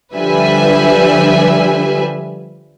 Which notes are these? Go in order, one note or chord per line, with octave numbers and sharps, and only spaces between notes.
D3 F3 G3 B4 E5 G#5